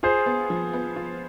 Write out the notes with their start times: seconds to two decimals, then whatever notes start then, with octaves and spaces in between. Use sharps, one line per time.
0.03 F4 G#4 C5
0.26 B3
0.50 F3
0.73 B3
0.96 F4